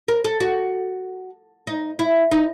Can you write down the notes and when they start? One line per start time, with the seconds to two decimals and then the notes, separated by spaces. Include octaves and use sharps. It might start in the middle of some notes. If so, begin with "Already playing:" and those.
0.08 A#4
0.24 A4
0.40 F#4
1.67 D#4
1.99 E4
2.31 D#4